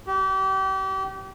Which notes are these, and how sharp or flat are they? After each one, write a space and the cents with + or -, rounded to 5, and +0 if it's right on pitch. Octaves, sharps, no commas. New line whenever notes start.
G4 -35